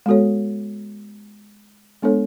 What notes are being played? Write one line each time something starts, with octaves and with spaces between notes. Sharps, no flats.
G#3 B3 F#4 A4 C#5
G#3 B3 D4 A4 C#5